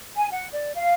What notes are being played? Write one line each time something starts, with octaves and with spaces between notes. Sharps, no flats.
G#5
F#5
D5
F5